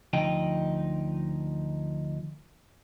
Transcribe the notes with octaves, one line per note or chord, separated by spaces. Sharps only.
D2 F3 D#4 G5